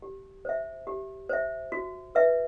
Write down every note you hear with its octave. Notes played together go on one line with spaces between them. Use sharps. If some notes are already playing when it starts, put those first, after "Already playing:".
G4
C5 E5
G4
C5 E5
F#4
B4 E5